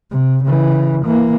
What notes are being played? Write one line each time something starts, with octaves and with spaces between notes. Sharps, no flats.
C3
C#3 E3
E3 A#3